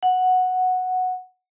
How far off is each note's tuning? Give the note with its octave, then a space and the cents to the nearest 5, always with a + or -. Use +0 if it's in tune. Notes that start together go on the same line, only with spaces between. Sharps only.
F#5 -5